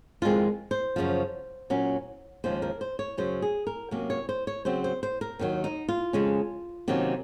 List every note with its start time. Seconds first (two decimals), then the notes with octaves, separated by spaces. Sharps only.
0.22 F2 D#3 G#3 C4 F4
0.71 C5
0.96 F#2 C#3 F3
1.70 A#2 F#3 C#4
2.44 D#2 C#3 F3 G#3 C5
2.62 A#4
2.81 C5
2.99 C#5
3.17 F#2 C#3 F#3 C#4 C5
3.42 G#4
3.67 A#4
3.91 C3 F#3 A#3 C#4
4.10 C#5
4.29 C5
4.47 C#5
4.65 C#3 F#3 C4 C5
4.84 C5
5.03 C5
5.21 A#4
5.39 D#2 D#3 F#3
5.64 D#4
5.88 F4
6.13 F2 C#3 G#3 C#4
6.88 C3 D#3 F#3 A#3 C#4